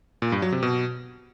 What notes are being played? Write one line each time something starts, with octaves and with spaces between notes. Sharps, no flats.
A#2
G2
F#3
C3
B2